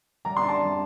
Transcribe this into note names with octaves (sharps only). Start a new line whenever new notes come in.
G3 A#5
C6
D4
A5
G3